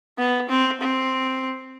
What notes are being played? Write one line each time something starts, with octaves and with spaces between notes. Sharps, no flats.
B3
C4
C4